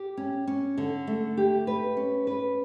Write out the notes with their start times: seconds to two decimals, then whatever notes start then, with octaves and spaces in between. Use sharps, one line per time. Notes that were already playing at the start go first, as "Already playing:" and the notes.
Already playing: G4
0.17 C#4
0.47 C#4
0.78 D3
1.07 A3
1.37 G4
1.67 B4
1.97 C#4
2.27 B4